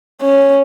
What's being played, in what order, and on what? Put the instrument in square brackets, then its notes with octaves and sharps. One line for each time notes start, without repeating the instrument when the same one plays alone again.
[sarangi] C#4